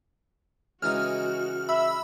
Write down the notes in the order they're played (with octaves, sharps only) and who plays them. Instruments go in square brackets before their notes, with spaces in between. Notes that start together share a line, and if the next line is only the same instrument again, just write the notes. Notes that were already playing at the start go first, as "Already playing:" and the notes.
[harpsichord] C#2 E3 D#4 [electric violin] F#4 [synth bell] F6
[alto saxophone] E5 [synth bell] B5 E6